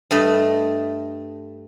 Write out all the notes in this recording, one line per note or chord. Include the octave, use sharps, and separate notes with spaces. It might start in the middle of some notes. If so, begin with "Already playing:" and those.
G2 A3 D#5